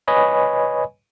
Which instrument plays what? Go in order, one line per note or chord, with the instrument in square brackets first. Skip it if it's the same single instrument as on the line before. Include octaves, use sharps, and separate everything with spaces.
[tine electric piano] B4 C#5 D#5 G#5 B5